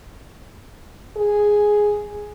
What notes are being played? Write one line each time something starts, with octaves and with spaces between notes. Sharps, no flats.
G#4